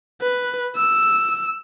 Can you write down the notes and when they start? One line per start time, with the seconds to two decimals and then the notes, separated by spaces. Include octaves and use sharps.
0.22 B4
0.76 E6